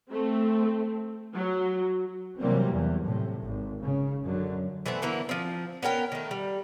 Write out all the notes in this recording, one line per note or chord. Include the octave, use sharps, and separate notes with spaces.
A3 C4
F#3
C3 E3 F#3 G3 A#3 C4
E2
A2 C3
G#1
C#3
F#2 D3 F#3
E3 A3 B3 C4
D3 E3 A#3 B3
F3 C4
B3 C#4 A#4 G5
D#3 A3
G3